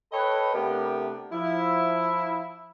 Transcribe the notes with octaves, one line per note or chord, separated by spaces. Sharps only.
A4 B4 C#5 D#5 G5 B5
C3 A3 B3 D4 G4 A#4
F3 E4